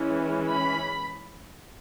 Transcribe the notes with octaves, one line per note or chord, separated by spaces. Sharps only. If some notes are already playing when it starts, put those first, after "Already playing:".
Already playing: E3 G#3 C#4
B5